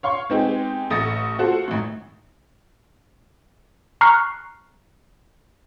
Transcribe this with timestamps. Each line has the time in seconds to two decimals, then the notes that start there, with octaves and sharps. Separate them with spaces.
0.03 C#5 F5 C6 C#6
0.30 G#3 B3 C4 D#4 G4 G#4
0.90 A1 A3 D#6 A6 A#6 C#7
1.39 F4 F#4 A4 C5 F#5
1.68 G#1 A2
4.01 A#5 C#6 F6 F#6 C7